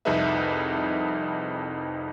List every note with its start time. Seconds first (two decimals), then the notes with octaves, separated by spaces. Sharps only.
0.05 C2 F2 D#4 G#4 B4 E5